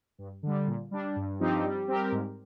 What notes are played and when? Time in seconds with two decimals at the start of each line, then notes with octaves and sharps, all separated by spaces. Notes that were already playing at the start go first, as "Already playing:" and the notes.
0.18 G2
0.43 D3 G3
0.67 A#2
0.91 G3 D4
1.16 G2
1.40 F3 C4 D#4 G4
1.64 G3
1.88 C4 G4 A#4
2.12 G#2